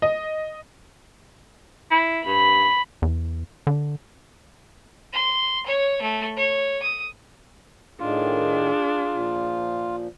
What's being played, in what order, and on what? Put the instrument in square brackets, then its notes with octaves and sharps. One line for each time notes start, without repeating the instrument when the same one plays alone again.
[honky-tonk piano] D#5
[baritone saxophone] E4
[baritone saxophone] G2 [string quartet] B5
[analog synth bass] E2
D3
[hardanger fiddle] C6
C#5
A3
C#5
D#6
[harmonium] A2 D#3 [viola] D4 G#4 [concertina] F4
[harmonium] A#2 F3